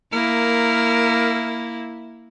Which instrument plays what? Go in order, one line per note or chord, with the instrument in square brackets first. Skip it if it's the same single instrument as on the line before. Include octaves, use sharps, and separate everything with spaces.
[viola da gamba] A#3 E4 [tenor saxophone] A#4